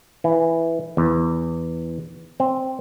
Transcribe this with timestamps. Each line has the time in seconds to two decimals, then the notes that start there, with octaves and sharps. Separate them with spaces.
0.24 E3
0.97 E2
2.40 C4